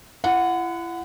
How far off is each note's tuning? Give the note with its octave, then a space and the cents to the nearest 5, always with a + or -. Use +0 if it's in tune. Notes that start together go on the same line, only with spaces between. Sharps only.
E4 +40 F#5 -10